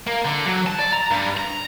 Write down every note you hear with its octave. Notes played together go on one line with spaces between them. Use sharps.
A#3
D3
F#3
A5
D5
A#5
G2
A#5